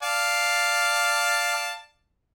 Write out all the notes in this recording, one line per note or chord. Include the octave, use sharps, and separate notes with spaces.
D5 F5 A5